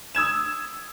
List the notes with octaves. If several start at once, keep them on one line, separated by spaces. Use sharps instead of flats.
D#6 E6 G#6 E7